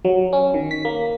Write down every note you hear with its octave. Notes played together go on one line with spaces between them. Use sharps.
F#3
C#4
D#3
B6
A#3